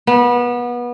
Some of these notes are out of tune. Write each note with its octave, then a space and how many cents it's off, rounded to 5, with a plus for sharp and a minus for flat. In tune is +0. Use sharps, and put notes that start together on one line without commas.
B3 -25